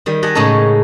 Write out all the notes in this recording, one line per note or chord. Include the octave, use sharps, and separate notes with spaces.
D#3 G3
G4 D#5 F#5 G#5 A5
A2 C#3 G#3 C#4 D#4 A4